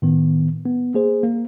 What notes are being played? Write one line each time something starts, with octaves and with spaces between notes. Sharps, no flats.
A2 D#3 B3
B3
A#3 G#4 C5
A#3